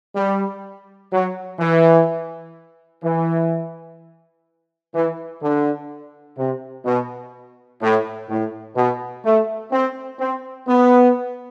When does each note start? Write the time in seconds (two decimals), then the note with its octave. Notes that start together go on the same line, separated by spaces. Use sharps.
0.16 G3
1.13 F#3
1.59 E3
3.03 E3
4.94 E3
5.42 D3
6.38 C3
6.85 B2
7.82 A2
8.29 A2
8.76 B2
9.25 A3
9.72 C4
10.20 C4
10.68 B3